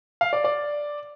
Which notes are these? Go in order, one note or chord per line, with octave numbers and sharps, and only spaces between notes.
F5
D5
D5